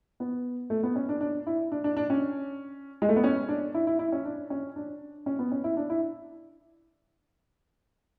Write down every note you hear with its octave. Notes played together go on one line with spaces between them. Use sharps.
B3
A3
B3
C#4
D4
D4
E4
D4
D4
D4
C#4
G#3
A3
B3
C#4
D4
E4
E4
E4
C#4
D4
C#4
D4
C#4
B3
C#4
E4
D4
E4